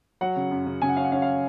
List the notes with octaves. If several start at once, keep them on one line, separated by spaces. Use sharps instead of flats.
F#3 F#5
C#3
F#2
C#3
C#3 G#5
F#5
C#4 F5
F#5
C#4 F5
F5